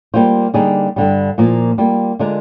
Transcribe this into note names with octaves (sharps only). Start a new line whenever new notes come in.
G3 A#3 F4 C5
D3 G3 A#3 D#4 G#4
G2 D3 G3
A#2 F3 A#3
G3 A#3 F4
D3 G#3 D4 F4 A#4